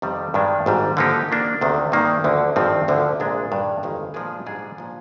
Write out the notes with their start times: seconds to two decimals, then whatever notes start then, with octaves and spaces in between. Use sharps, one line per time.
0.02 F2 C3 D#3 G3
0.34 G2 D#3 G#3 D4
0.66 G#1 G#2 G3
0.97 D3 F3 A#3 D#4 G4
1.29 D#3 A#3 D4
1.61 D2 C3 D#3
1.92 G2 D#3 A#3 D#4
2.24 D2 D3 F3
2.56 G#1 G2 F3 C4 D#4
2.88 D2 D3 F3
3.20 A#1 A#2 G#3 D4
3.52 G2 D#3 G3
3.83 G1 F2 D#3 G#3
4.14 A#2 F3 G#3 D4 G#4
4.46 G#2 G3 D4 G#4
4.78 A#2 F3